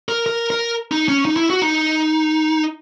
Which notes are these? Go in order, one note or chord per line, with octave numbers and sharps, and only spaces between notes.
A#4
A#4
A#4
D#4
C#4
D#4
E4
F#4
D#4